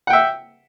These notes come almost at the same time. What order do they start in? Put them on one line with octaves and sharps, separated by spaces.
F#5 G5 E5